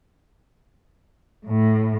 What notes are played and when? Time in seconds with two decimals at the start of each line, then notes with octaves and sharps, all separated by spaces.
1.47 A2